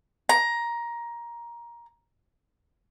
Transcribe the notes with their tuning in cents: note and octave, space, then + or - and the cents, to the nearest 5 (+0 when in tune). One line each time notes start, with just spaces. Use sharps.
A#5 +15